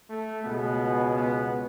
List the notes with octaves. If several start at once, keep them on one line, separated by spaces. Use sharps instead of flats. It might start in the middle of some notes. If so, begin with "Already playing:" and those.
A3
C#2 B2 G#3 B3
B3